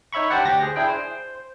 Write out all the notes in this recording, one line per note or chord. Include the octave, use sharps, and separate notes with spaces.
D#4 C#5 E5 B5 C#6
D4 G4 C5 D5 F#5
D2 G4 A#6
G#4 C5
D4 E4 G#4 G5
C5